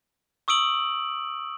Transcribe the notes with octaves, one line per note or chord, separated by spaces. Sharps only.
C#6 D#6 E6 D7 F#7